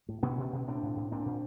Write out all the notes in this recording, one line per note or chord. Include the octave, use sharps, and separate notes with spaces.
A2
B2 B3 C#4
B2
B2
A2 C4 D4
A2
A2
A#2 C4 D4
A#2